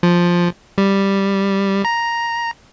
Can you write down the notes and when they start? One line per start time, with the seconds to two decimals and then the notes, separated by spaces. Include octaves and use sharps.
0.03 F3
0.78 G3
1.85 A#5